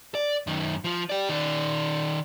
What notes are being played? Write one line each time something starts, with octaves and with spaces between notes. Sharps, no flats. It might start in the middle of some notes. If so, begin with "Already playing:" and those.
D5
F#2 D#3
F3 F4
G4 D5
D#3 D5